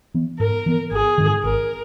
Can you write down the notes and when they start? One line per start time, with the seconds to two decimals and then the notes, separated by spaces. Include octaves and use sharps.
0.14 E3 B3
0.39 G#2 A#4
0.66 E3 B3
0.91 G#1 G#4
1.18 G#2 D#3
1.43 G#1 A#4